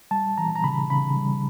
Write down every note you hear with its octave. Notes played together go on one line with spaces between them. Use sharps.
G3 A5
E3 A#5
A#5
C#3 B5
C#3 B5
G3